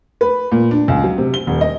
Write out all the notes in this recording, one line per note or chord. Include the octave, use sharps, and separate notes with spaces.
B4
A#2
D4
C#2
F#3
C3
G7
D#1
D#5